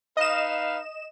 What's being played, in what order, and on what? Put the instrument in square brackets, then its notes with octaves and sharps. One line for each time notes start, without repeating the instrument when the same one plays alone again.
[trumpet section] D#4 B4 F5 [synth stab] D#5 E7